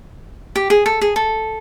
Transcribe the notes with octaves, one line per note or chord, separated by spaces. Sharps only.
G4
G#4
A4
G#4
A4